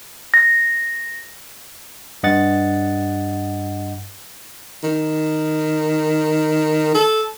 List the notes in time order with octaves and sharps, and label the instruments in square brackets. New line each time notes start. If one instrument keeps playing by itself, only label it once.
[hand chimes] A#6
[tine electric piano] G2 D#5 F#5 A6
[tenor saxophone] D#3
A4